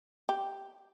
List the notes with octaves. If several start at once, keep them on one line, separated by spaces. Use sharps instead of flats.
G4